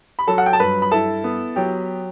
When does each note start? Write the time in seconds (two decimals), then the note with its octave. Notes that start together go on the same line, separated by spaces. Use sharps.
0.19 B5
0.27 F#3 A4 A5
0.38 F#5
0.46 G5
0.53 A5
0.59 G2 B4 B5
0.82 B5
0.92 E4 A4 A5
1.24 B3
1.56 F#3 G4 G5